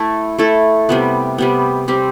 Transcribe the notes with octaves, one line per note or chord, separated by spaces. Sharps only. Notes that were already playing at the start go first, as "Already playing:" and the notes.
Already playing: A3 E4 A4
A3 E4 A4
C3 G3 B3
C3 G3 B3
G3 C4 G4